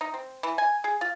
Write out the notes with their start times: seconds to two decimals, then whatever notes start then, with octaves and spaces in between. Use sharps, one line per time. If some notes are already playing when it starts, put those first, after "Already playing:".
0.01 D#4
0.14 C4
0.43 E3
0.58 G#5
0.84 G#4
1.01 F4